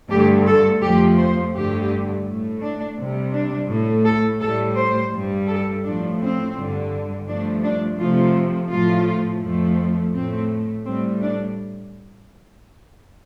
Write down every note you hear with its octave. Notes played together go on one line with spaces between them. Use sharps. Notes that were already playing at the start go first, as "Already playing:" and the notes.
G2 D3 A3 G4
A4
F2 F3 A3 G4
C5
G2 D3 A3 G4
A2 A3
D4
C3 G3
D4
A2 A3
A4
A2 G3 A4
C5
G2 G3
A4
A2 F3 A3 D4
C4
G2 D3 G3
G2 F3 A3 D4
D4
C3 F3 A3 F4
A2 F3 A3 F4
F2 F3 A3
A2 A3 C4
A2 G3 C4
D4